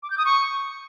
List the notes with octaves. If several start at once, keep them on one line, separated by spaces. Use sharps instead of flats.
D6
G6
D#6
C#6